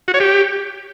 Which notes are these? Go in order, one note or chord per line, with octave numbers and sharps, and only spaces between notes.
F#4
C#5
G4